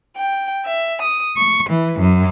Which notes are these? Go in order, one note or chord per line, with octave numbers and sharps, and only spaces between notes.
G5
E5
D#6
C#6
E3
F#2